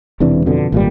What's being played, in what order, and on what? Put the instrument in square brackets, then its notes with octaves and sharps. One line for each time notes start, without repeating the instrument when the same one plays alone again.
[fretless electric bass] E1 C3 E3 D4
F2 B2 D3
G#1 A#2 G3